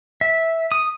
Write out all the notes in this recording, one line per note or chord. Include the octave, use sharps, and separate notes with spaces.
E5
D#6